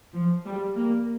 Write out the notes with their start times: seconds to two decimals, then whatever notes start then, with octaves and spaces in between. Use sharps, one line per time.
0.15 F3
0.46 G3
0.77 A#3